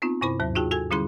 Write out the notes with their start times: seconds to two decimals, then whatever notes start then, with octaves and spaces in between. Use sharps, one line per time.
0.02 B3 C4 D#4 F4
0.21 G2 C3 E4 C5 B5
0.40 D#2 G#2 F#3 C5
0.55 D#4 F4 F#4 G#4 G5 A5
0.71 F#4 A4 G#5 G#6
0.91 D3 G3 C#4 E4 G#4 C6